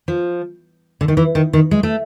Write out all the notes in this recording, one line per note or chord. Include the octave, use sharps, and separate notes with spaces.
F3
D3
D#3
E3
D#3
D#3
G#3
A3